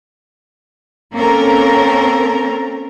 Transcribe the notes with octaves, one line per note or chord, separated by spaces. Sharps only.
A#3 C4 C#4 A4 A#4